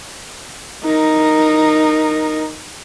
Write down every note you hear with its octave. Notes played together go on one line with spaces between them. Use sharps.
D#4 A#4